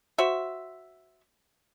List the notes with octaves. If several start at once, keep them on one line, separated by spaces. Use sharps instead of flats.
F#4 C5 E5